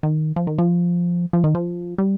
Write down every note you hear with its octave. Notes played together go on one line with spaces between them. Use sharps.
D#3
F3
D#3
F3
F3
D#3
F3
G3